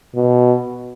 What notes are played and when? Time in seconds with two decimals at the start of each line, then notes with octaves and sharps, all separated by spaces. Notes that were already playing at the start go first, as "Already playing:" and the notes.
0.16 B2